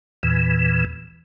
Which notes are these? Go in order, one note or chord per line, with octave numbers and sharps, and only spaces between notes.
E2 A#2 E3